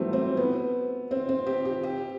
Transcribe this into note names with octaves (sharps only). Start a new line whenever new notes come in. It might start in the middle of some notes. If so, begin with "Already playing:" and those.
Already playing: E3 F#3 G3 A3 B3 C4
C4
B3
C4
C4
G4
G4
G4